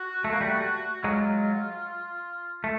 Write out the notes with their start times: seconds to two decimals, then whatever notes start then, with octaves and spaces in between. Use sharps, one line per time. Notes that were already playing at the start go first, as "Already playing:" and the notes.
Already playing: F#4
0.24 A3
0.33 A#3
0.41 G3 A3
1.04 F#3 G#3 F4
2.64 A3